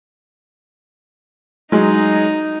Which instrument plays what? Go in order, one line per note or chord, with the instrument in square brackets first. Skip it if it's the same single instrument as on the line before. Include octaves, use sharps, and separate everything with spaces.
[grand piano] F#3 G#3 [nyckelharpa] D#4